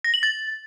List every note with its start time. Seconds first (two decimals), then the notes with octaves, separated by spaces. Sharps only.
0.04 A#6
0.14 F#7
0.23 A6